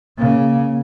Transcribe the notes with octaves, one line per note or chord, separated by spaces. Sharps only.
C#3 A#3